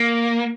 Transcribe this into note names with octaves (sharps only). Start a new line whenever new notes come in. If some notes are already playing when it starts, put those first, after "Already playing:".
Already playing: A#3